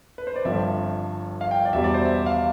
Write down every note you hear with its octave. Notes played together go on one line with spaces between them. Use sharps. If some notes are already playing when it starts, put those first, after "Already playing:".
B4
C5
D5
G1 G2 F3 C4 E5
F5
G5
D5
E2 B2 G3 E5
D5
C5
E5
F5